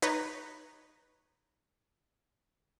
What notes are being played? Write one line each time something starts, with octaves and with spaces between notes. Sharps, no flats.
D#4 B4 C#5